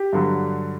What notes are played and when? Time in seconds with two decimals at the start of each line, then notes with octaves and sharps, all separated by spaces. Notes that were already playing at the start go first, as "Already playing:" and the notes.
Already playing: G4
0.13 G2 D3 F#3